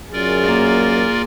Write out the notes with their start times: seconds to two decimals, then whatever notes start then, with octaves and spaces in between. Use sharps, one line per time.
0.13 F#2 F4 G#4 A#4 D5
0.43 A#3